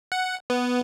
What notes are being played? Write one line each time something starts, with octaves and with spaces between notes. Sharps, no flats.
F#5
B3